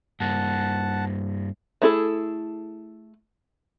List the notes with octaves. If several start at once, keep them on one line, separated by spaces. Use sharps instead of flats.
G2 A#3 F#5 A5
A3 D4 E4 G#4 A4